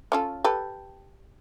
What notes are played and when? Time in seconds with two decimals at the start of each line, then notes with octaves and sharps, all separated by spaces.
0.12 C#4 F4 A4
0.44 G4 A4 B4